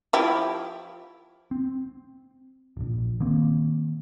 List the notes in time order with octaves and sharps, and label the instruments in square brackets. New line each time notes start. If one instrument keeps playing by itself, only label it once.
[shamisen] F3 E4 G4
[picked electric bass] C4
D1 A#1
D#3 A#3 C4